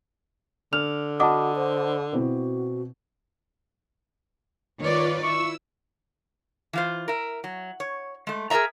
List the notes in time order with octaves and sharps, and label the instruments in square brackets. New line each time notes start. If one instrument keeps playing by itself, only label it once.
[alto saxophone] D3 [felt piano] F6 [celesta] F7
[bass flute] F#4 [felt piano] D#5 A5 B5 [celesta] F#5 D6 D#6
[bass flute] C5
[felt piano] B2 C4 E4 [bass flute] F#4
[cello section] D#3 C#5 D5 [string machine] F4 B4
[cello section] E4 [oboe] C#6 [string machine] E6
[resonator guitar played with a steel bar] E3 F4 C5
A#4 E5
F#3
C#5
G#3 A3
G#4 A#4 B4 D5 E5 A#5